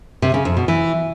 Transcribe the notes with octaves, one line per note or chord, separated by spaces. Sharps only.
C3
C#3
F2
B2
E3